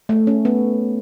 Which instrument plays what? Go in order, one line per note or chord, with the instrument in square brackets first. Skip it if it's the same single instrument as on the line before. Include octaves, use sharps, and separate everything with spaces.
[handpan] A3
C#4
B3